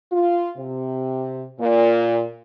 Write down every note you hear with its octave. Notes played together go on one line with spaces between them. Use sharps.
F4
C3
A#2